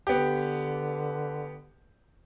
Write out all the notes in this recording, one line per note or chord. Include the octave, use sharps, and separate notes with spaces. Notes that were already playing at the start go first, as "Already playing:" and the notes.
D3 B3 G4